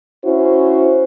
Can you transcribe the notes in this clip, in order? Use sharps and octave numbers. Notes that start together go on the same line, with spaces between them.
C#4 E4 F#4 C5